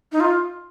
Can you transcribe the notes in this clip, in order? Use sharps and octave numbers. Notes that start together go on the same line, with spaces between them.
D#4
F4